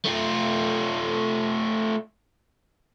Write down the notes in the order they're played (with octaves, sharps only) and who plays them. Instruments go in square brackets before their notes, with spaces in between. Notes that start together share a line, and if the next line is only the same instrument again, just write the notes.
[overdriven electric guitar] A3 F4